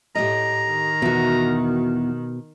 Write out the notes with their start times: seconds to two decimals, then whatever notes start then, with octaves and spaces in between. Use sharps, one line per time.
0.15 A2 G4 D#5 A#5
0.69 D#3
1.02 E2 B2 F#4